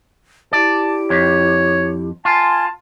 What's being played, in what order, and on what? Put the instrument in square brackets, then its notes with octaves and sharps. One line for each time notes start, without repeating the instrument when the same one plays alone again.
[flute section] E4 G4 [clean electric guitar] D5 [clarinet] A5
[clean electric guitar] F2 [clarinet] C#5
[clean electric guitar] F4 [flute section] G#5 C6 G#6 [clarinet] A5